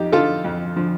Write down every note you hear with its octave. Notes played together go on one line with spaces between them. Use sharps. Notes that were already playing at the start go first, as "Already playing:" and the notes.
Already playing: F2 D#4 G4
D3 F3 F4 A4
F2
D3 F3